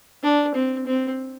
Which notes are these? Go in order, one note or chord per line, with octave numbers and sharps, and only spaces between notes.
D4
C4
C4